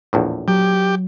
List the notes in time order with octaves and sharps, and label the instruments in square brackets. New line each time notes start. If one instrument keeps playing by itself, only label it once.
[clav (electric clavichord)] A#1 E2 A2
[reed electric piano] F#3 [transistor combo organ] G4